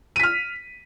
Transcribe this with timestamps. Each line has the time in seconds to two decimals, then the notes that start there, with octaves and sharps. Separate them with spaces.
0.16 D#7
0.20 B6
0.23 F6